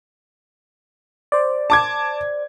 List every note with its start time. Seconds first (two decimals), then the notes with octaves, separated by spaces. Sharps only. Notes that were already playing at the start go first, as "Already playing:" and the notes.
1.32 C5 D5
1.70 A5 D6 G#6